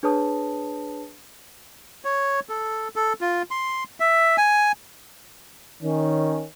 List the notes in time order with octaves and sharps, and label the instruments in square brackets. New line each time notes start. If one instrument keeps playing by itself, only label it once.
[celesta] D4 G#4 B4 C#5 A5 D#6
[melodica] C#5
A4
A4
F4
C6
E5
G#5
[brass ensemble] D#3 C#4